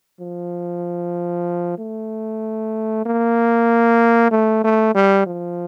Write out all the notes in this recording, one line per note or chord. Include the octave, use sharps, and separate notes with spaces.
F3
A3
A#3
A3
A3
G3
F3